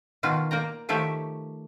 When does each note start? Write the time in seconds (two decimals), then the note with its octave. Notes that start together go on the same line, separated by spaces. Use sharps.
0.23 B2 D#3 F4 F#4
0.51 A#3 D5 G5 A#5
0.89 D#3 F3 A3 G4 C#5 E5